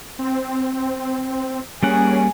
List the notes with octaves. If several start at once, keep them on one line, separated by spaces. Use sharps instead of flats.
C4
G3 A#3 C#4 G#4 F#5